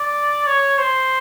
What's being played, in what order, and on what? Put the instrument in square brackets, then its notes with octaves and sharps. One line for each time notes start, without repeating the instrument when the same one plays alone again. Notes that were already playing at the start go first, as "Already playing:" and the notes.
Already playing: [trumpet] D5
C#5
C5